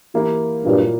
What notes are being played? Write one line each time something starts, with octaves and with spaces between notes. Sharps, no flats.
E3 A#3 E4 G4
G2 A#2 F#3 A#3 E4